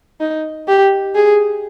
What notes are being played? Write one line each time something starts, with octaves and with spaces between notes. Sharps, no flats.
D#4
G4
G#4